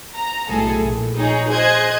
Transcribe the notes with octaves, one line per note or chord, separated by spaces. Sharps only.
A#5
B1 A2 G#4 A4
A#1
D#4 G#4 C#5
G#4 C5 D#5 F#6 G#6